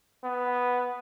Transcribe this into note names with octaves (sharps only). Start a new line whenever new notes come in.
B3